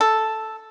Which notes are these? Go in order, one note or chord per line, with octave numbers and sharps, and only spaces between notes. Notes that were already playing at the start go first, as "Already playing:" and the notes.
A4